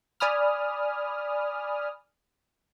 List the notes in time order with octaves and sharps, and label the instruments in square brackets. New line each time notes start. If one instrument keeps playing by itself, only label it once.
[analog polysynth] D5 G#5 B5 D#6 F6